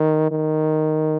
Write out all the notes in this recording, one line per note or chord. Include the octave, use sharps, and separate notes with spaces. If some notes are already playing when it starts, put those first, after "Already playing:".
Already playing: D#3
D#3